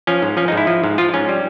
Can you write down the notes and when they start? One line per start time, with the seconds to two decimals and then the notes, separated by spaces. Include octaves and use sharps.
0.07 F3 C#4
0.22 G#2
0.37 F3 C#4
0.48 D#4
0.52 G#2
0.57 E4
0.67 F3
0.84 G#2
0.98 F3 F4
1.14 G#2 C#4
1.29 G3